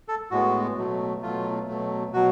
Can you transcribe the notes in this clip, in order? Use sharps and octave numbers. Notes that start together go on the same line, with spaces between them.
A4
A2 G#3 B3 F#4
B2 F#3 A3
B2 F#3 A3 F4
B2 F#3 A3
B2 F#3 F#4